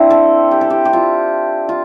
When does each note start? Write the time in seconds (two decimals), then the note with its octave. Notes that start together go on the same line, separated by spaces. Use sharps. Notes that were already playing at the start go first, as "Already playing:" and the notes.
Already playing: C4 D4 E4
0.10 A4
0.51 G4
0.61 A4
0.70 G4
0.85 G4
0.93 F4
1.69 F4